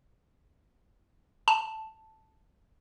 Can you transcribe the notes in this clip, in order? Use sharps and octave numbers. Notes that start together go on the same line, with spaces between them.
A5